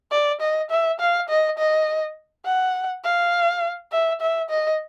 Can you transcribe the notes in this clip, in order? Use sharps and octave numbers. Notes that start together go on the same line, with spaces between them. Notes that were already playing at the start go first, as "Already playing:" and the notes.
D5
D#5
E5
F5
D#5
D#5
F#5
F5
E5
E5
D#5